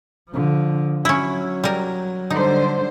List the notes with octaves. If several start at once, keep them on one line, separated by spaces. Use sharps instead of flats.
D3 F3
F#3 C#4 E4
G3 A#4
D3 G3 D#4 C5